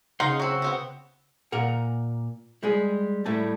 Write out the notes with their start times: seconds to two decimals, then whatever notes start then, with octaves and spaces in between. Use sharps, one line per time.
0.20 C#3 D#4 F5 F#5 C6
0.40 F#3 C4 F#4 E6
0.62 B3 C4 F#5
1.52 A#2 A#4 F#5
2.63 G3 G#3 G#4
3.26 A2 G3 A3 A5